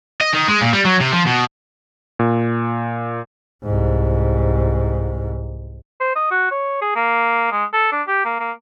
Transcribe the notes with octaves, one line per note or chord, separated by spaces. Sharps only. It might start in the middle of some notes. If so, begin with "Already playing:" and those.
D#5
D#3
G#3
A#2
G3
F#3
C3
F3
B2
A#2
C2 G#2
C5
D#5
F#4
C#5
G#4
A#3
G#3
A4
D4
G4
A#3
A#3